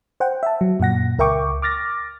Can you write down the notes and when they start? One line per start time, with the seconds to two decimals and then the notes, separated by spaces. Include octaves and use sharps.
0.20 C5 F#5 G5
0.43 E5 A5
0.61 F#3
0.80 F#2 A#2 F#5 A#6
1.19 C#2 A#4 E5 G5 C#6 D6
1.62 D6 F6 A6 A#6